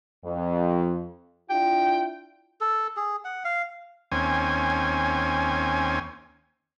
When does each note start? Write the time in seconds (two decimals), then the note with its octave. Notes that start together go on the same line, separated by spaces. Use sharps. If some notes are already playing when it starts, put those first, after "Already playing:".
0.25 F2
1.50 D4 E4 F4 G5
2.61 A4
2.97 G#4
3.25 F#5
3.45 F5
4.12 D#2 C4 C#4 G#5